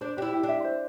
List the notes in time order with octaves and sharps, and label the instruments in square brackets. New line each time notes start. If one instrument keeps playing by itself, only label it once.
[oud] D4 [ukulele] C5
[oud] D4 [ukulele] G4
[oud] E4
[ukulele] G4
[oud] D4
[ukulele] E5
C5